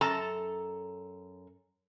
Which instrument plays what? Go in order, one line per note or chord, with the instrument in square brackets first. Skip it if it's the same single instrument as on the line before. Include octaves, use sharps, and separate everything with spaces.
[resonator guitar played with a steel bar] F#2 A4 A5 A#5